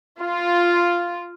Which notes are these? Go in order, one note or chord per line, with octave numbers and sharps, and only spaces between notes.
F4